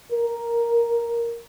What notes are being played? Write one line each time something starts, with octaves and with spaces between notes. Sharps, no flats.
A#4